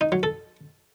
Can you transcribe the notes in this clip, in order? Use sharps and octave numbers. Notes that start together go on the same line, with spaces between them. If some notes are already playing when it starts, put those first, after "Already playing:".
D#4
F#3
A4